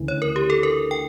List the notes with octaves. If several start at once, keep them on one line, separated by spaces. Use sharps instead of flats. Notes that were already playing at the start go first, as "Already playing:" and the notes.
Already playing: D2 C#3 E3
C#5
A#4
G4
A4
A#4
G5